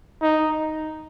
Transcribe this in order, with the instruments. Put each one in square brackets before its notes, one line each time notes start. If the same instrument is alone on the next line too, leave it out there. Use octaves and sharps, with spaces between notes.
[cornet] D#4